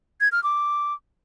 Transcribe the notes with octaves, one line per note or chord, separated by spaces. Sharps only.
G#6
F6
D6